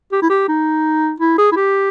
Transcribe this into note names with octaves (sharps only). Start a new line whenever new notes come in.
G4
E4
G4
D#4
E4
G#4
E4
G4